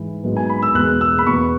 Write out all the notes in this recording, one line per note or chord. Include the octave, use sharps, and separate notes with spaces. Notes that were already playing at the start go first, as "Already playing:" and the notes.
Already playing: G#2 E3
G#2 F#3 B3
G#5
B5
E6
E2 B2 G#3 B3 F#6
E6
B5
E2 B2 B3 C#6